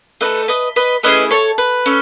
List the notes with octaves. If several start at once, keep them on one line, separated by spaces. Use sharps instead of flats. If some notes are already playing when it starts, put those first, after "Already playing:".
A3 D#4 A4 B4 D#5
B4 D#5
B4 D#5
A3 C#4 E4 G#4 B4 D#5
A4 C#5
B4
A3 C#4